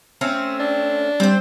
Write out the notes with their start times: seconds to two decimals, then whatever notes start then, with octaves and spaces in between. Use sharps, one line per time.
0.21 A3 C4 C#4
0.60 D4
1.20 G3 C4 C5